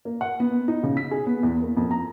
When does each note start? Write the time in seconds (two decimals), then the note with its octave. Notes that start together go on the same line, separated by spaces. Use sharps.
0.05 A#3
0.21 F#5
0.40 B3
0.68 D#4
0.83 C#3
0.97 B6
1.11 G#4
1.27 B3
1.43 E2
1.62 A#3
1.77 F2
1.91 A#5